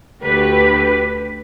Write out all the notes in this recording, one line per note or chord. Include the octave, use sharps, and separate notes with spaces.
D2 D3 A3 G4 B4